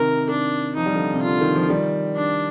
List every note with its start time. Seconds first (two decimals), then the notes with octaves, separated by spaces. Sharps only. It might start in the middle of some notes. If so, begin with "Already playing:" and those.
Already playing: C3 D#3 A#4
0.30 D4
0.76 F3 D#4
0.86 G3
0.94 D3 F3
1.14 C3
1.23 D3 F4
1.41 D#3
1.56 F3
1.70 D#3 G3
2.16 D4